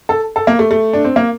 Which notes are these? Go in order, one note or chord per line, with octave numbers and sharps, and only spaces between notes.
A4
A4
A#3
A3
A3
D4
C4
A#3